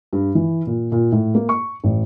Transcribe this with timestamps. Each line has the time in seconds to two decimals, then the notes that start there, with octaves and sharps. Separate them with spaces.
0.13 G2
0.35 E3
0.67 A#2
0.92 A#2
1.12 A2
1.35 A#3
1.49 C#6
1.84 A1